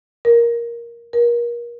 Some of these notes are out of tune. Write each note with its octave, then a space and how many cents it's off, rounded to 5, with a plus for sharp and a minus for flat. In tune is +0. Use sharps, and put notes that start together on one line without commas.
A#4 +10
A#4 +30